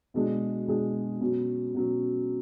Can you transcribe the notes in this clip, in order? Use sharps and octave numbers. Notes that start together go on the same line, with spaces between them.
B2 G#3 D4 G#4
B2 G#3 D4 G#4
B2 F#3 C#4
B2 F#3 C#4